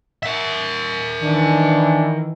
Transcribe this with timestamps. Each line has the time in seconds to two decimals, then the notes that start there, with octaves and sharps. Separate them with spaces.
0.23 A#4 E5
1.22 D#3 E3 D4